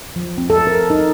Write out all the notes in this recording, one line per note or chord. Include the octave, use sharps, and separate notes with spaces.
F3
C4
A4
A#4
D#4